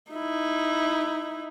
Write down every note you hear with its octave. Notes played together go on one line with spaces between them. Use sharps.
D#4 E4